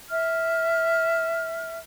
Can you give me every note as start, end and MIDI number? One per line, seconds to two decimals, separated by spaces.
0.09 1.78 76
0.09 1.78 89